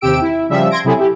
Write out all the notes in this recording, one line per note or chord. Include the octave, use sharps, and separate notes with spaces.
D#2 C3 G4 E6 D7
E4
C#3 F3 G3 E5
C6 G#6 A#6 D7
C3 F#3 E4 G#4 A4
E4 G4